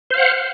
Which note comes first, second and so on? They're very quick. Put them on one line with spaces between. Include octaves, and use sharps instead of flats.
C5 F5 F#5